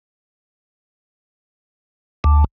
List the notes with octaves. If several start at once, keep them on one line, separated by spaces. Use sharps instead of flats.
D2